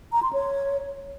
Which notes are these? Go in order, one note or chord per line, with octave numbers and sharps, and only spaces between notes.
A#5
C6
C#5